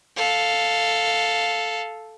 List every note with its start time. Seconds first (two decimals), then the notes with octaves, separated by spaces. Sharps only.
0.17 A4 F5